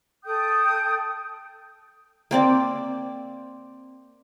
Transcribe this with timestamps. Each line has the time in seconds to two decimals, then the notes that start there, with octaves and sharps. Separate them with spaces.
0.24 A4 G5 D#6 G6
2.31 A#3 C4 D5